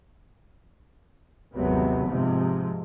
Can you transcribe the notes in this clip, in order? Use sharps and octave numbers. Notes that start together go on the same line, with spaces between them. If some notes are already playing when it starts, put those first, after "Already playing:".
G1 D#2 C3 F#3 G#3 B3
G#2 C3 F3 G#3